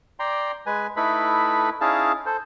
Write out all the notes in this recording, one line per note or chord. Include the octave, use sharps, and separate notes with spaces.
D5 G5 A#5 C6
G#3 B4 G#5
A3 D#4 E4 A4 B4 B5
C#4 D#4 E4 G#4 F5 A5
A4 C5